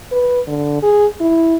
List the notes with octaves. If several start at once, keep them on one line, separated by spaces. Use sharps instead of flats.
B4
D3
G#4
E4